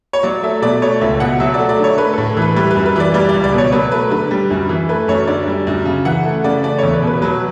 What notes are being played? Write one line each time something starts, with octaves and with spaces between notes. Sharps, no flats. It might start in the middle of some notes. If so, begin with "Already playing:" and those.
C#5
F#3 D5
A3 E5
B2 D5
A3 C#5
C#2 E5
B2 F#5
F#3 E5
D5
A3
D5
D3 C#5
A3 B4
A2 A4
E3 B4
G3 B4
B4
F#2
B4
E3 D5
G3 D5
C#2 D5
D5
B2
C#5
F#3 B4
A3 B4
D3 B4
G3
F#2
E3
A3 B4
F#2 C#5
D3 D5
G3
F#2
C#3
E3 F#5
A3
C#3 D5
A3 D5
E2 C#5
B4
B2
B4
F#3 B4